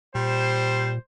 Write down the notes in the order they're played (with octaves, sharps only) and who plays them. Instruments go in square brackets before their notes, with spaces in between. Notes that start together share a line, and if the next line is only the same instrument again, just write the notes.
[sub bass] A#2 [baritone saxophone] G3 [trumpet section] C5